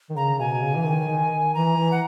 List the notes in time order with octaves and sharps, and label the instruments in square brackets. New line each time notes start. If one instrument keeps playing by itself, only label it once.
[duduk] D#3
[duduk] C#3 [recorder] A#5
[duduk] B2 [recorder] G#5
[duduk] C#3
E3
D#3
D#3
[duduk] E3 [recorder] A#5
[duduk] E3
[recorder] F#5